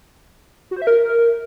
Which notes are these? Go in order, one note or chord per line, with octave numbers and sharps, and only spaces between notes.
F#4
C5
E5
A#4